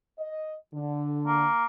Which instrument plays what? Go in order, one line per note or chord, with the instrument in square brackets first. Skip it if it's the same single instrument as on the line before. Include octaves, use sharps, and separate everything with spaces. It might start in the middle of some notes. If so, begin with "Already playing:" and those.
[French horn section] D#5
D3
[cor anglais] A#3